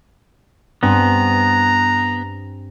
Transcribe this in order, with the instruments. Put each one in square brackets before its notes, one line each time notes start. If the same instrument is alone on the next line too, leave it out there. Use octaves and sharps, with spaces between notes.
[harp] G2 C4 G#5 [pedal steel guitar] B3 [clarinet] A#5